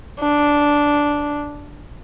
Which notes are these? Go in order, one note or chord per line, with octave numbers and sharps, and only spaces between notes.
D4